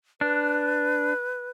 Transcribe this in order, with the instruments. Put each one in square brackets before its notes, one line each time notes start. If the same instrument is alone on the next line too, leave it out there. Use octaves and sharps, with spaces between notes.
[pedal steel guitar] D4 [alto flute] B4